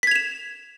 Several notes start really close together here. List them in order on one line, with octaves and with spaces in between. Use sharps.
B6 G#6 F7 E7